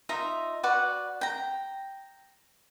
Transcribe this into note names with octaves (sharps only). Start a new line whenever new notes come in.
D#4 F4 E5 A#5
F#4 B4 D5 F#5
G5 A#5